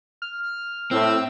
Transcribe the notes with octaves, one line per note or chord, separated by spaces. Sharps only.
F6
A2 C4 E6